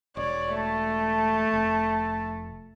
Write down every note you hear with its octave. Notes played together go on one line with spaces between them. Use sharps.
E1 C#5 D5
A3 A5
F1